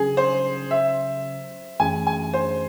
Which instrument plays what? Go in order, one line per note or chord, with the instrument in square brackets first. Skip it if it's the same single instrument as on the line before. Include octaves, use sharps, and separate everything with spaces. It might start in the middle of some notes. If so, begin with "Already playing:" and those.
Already playing: [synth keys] C#3 F#3 C#4 [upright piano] G#4
[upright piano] C5
E5
[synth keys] F#2 E3 A3 C#4 G#4 [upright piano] G#5
[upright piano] G#5
C5